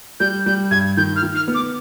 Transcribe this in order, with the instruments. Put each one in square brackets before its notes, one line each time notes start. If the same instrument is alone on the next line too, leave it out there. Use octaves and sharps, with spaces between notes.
[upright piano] G3 [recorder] G6
[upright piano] G3 [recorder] G6
[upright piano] G2 [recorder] G#6
[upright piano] D#3 [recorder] G6
[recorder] F6
[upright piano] D#3
[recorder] F6
[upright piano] B3
[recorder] D6